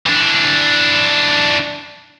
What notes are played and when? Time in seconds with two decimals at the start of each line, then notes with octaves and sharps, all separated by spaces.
0.07 E3 D4